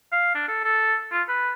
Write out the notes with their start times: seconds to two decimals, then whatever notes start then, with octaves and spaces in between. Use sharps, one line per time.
0.12 F5
0.35 D4
0.48 A4
0.64 A4
1.12 F4
1.29 B4